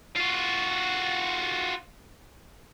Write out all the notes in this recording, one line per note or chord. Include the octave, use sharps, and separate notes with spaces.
F4 F#4